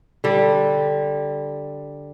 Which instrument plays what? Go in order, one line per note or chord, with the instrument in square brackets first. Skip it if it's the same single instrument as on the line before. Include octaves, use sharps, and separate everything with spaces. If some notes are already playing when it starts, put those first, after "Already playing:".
[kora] D3 G3